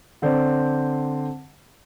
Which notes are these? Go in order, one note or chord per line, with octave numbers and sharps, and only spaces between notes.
D3 C4 C5 D5